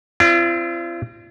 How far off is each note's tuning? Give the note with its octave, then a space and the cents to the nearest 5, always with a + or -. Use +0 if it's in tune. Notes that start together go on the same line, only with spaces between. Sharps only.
C4 +0 F4 -45 D5 +0